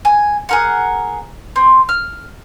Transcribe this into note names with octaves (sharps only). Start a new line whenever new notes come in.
G#5
G#4 A#4 F#5
C4
F6